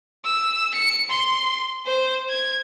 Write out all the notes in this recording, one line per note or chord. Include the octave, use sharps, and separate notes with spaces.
E6
C#7
C6
C5
G#6